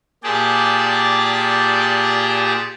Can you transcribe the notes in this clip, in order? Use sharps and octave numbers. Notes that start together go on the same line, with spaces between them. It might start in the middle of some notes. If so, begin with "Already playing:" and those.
A#2 G4 G#4 D5 G5 A5